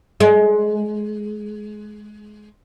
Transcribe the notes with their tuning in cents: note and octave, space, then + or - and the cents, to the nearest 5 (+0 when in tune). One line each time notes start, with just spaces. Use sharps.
G#3 +20